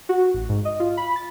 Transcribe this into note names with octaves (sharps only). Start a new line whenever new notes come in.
F#4
A1
G#2
D#5
F4
B5
A6